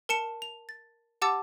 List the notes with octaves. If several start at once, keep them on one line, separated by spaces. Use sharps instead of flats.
A#4 A5 C#7 E7
F7
A6
G4 F#5 A5 D6 E6 A6